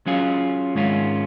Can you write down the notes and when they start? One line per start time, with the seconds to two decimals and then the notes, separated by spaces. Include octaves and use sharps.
0.06 F#3 C#4 F4 G#4
0.75 G#2 D#3 G#3 C#4 F4